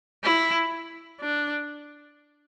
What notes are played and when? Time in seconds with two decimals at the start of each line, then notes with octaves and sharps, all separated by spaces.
0.24 E4
1.21 D4